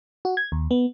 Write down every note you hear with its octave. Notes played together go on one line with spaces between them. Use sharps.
F#4
G#6
D#2
B3